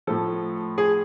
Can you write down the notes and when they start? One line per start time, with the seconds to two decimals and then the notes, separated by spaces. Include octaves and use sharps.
0.07 A2 F3 A4
0.78 G#4